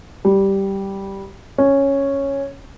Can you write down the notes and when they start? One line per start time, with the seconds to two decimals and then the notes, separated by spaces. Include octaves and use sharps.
0.25 G3
1.58 C#4